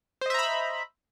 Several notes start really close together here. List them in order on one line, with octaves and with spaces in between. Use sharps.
C5 D#5 E5 A#5 B5